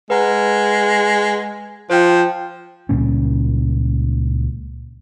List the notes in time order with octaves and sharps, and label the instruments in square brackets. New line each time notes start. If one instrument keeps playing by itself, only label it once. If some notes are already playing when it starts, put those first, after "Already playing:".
[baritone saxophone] G#3 [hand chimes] B4 F#5 A#5
[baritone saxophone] F3 [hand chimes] C5 G5
[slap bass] C#2 A#2 G3 C#4